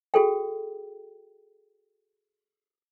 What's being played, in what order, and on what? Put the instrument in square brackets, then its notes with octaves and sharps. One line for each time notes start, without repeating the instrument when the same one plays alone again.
[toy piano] F#4 G#4 A4 G5